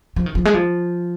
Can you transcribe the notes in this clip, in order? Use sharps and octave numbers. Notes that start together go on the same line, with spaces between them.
F3
D#3
F3
G#3
F3